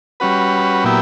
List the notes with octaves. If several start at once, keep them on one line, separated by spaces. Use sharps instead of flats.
G3 C#4 F#4 B4
A#2 F#3 B3 E4 G4